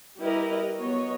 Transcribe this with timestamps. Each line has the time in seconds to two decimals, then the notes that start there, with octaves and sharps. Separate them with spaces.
0.19 G3 E4 G4 A#4 B4 D#5
0.76 F#3 B3 C#5 D#5